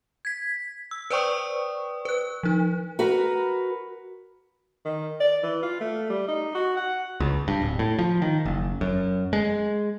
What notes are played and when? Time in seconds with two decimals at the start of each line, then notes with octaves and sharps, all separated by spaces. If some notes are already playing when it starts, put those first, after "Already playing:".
0.25 G#6 B6
0.91 E6
1.10 B4 C5 D5 G5 C#6 D#6
2.05 B4 F#6
2.43 F3 D#4
2.99 F#4 A#4 B4
4.85 D#3
5.20 D5
5.43 E3
5.63 F4
5.81 A3
6.10 G3
6.28 D#4
6.55 F#4
6.77 F#5
7.20 C#2
7.48 G2
7.62 D1
7.79 A2
7.99 F3
8.22 D#3
8.45 F#1
8.81 F#2
9.33 G#3